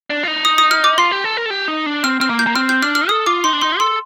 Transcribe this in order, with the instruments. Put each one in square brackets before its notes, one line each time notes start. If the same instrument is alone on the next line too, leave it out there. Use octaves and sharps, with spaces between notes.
[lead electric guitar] D4
F4
D#4
[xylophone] D#6
D#6
F6
D6
[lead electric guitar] F4 [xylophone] C6
[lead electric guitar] G4
A4
A#4
A4
G4
D#4
D4
[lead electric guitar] C4 [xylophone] F6
[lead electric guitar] C4 [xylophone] F6
[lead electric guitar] A#3
[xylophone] G6
[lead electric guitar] A#3
[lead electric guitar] C4 [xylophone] F6
[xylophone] G6
[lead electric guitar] D4 [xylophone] F6
[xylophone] F6
[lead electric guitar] A4 [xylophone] D#6
[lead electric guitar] F4 [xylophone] D6
[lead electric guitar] D#4 [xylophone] C6
[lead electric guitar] D4
[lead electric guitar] D#4 [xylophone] C6
[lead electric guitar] A4 [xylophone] C6